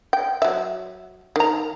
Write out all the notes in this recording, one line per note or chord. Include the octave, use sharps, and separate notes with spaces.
G5
F#3 E5
D#3 A#5